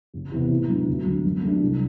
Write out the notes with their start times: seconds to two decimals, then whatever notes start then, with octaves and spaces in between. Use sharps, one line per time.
0.14 F#1
0.32 E2 C3 E3 B3
0.51 A2
0.69 F#3 B3 D4
0.87 D2
1.05 D3 F#3
1.24 F#2
1.43 F#3 A3 D4
1.61 C2